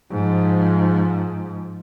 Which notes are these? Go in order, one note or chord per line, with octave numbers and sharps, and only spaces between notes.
G#2 F3